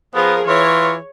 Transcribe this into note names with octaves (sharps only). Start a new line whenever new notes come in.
F3 B3 G#4 A#4
E3 F4 C#5